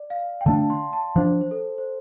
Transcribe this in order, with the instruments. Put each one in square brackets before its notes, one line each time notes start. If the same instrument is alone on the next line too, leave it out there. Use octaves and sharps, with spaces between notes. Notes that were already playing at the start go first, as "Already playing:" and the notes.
Already playing: [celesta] D5
F5
G5
[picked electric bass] D3 A3 D4 [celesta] A5
[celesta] C6
A5
[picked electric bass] F3 D4 [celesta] C5
[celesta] C5
A4
C5